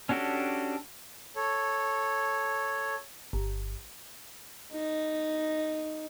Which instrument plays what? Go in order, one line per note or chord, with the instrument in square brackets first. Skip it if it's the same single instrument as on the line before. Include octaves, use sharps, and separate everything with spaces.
[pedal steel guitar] C#4 D4 F#4 G4 A4
[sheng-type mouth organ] A4 C#5
[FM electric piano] G1
[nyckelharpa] D#4